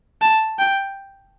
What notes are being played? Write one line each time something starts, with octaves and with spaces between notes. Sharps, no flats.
A5
G5